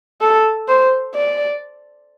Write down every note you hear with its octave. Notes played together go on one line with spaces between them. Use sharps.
A4
C5
D5